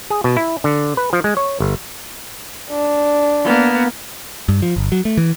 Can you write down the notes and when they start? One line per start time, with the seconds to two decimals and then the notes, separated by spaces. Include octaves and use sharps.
0.10 G#4
0.24 B2
0.37 E4
0.64 D3
0.97 B4
1.13 F3
1.24 G#3
1.37 C#5
1.60 G1
2.70 D4
3.44 A#3 B3
4.49 G2
4.62 F3
4.76 G1
4.92 F#3
5.05 A3
5.17 E3